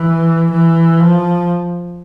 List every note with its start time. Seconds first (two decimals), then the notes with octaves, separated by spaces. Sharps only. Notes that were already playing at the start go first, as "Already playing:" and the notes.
Already playing: E3
0.52 E3
1.00 F3